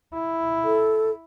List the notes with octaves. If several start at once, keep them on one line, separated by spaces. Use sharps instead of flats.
E4
A4